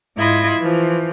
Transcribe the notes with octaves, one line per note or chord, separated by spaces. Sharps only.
G#2 E4 F4 D#5 B5 G#6
E3 F3